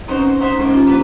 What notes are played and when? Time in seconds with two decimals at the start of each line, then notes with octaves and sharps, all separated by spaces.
0.08 C4 C#4 D#4 F#4 B4 C5
0.41 D#4 C5 E5 F#5 C6 F#6
0.60 G#2 A#3 C#4
0.73 C#4 F4 G4
0.87 F3 A#3 D4 B4